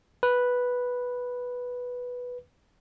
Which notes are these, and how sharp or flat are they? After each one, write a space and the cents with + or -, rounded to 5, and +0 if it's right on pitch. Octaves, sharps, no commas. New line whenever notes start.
B4 -5